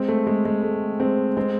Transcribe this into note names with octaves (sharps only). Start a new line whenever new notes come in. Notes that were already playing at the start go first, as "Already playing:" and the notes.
Already playing: G#3 C4
A3
G#3
G#3
A3
G#3 C4
G#3 C4